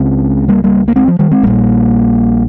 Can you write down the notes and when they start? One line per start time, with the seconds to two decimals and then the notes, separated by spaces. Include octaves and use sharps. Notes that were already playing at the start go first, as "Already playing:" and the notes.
Already playing: C#2 C#3 G#3 C4
0.48 G3 A#3
0.64 G3 A#3
0.88 A#3
0.96 G#3 C4
1.08 F3
1.19 D#3 G3
1.31 G#3 C4
1.43 A#1 A#2 G3 A#3